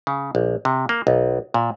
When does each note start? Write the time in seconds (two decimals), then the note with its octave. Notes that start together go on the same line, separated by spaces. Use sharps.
0.07 C#3
0.35 A#1
0.65 C3
0.89 A#3
1.07 B1
1.54 A#2